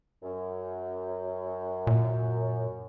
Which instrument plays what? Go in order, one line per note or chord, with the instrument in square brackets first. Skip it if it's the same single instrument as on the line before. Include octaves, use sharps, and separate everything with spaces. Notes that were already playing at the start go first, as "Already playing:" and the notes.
[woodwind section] F#2
[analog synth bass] A#2